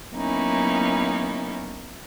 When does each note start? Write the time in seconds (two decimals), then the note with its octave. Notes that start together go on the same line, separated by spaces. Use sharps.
0.13 F#3 A#3 B3 C#4 D#4 E4